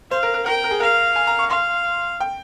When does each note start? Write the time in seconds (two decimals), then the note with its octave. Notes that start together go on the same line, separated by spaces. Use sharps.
0.11 C5 F5
0.23 A#4
0.34 A#4
0.46 A#4 G5
0.64 A#4
0.71 G#4
0.80 A#4 F5
1.16 G#5
1.27 A#5
1.39 C#6
1.50 F5 C6
2.20 G5